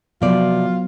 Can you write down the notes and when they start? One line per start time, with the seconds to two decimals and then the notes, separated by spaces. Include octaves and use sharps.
0.22 C3 F3 F#3 B3 F4 D5